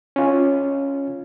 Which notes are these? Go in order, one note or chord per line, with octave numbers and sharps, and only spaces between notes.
C#4 F4